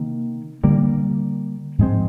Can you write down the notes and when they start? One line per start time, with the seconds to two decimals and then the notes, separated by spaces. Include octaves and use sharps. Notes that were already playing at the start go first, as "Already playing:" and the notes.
Already playing: C3 D#3 A#3
0.64 D3 G3 A#3
1.78 G#2 F3 G#3 C4